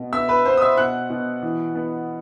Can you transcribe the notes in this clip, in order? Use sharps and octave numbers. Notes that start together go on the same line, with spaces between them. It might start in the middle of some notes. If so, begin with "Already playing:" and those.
Already playing: B2
B3 E5 E6
B4 B5
B3 C5 C6
D#6
E5 E6
B2 F#5 F#6
B2
E3
B3